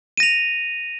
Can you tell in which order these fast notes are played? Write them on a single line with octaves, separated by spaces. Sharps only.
D#7 A#6 F7